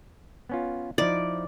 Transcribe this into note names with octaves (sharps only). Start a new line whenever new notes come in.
B3 C#4 F4
F3 D#4 E4 D5